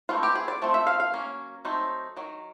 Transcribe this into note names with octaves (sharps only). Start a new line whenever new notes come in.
E3 A3 C4 D#4 F4
G4
G#4
D5
F3 A3 C4
E5
F5
F5
F#3 A#3 C#4
F#3 A3 C4 D#4
D#3 F#3